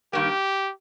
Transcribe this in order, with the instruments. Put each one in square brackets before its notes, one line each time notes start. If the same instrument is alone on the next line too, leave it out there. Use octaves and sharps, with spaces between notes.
[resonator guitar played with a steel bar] G2 D#3 A#3 [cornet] G4